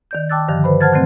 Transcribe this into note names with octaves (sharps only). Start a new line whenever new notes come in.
D#3 D5 G6
G5 A5 D6 E6 F#6 A6
G2 D3 D#3 F3
B4 C5 B5
C5 F#5 A5 F6 G#6 A6
A#2 D3 D#3 F#3 A3 C4